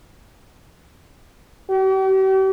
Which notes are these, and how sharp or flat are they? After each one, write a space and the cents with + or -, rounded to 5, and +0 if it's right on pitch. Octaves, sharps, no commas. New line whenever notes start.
G4 -45